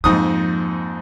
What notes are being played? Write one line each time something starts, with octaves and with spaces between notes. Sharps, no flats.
F2 G#2 F3 A#3 D#6